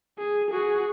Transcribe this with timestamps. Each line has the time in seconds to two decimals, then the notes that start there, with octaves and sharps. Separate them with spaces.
0.19 G#4
0.51 F#4 G#4